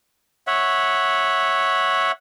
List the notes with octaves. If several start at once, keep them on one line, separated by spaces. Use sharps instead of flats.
C#5 E5 F#5